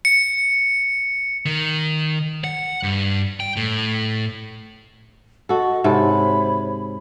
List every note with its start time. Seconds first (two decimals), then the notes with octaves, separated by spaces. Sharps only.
0.05 C#7
1.46 D#3
2.44 F#5
2.83 G2
3.40 G5
3.56 A2
5.49 F#4 A4 D#5
5.84 G#2 C3 A4 C5 C#5 B5